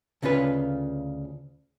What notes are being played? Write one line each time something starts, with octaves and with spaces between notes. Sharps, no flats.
D2 C#3 C#4 F4 B4